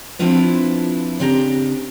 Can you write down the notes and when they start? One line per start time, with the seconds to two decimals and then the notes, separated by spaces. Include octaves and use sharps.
0.19 F3 C4 D4 E4 F4 B4
1.19 C#3 C4 D4 G4 F#5 A#5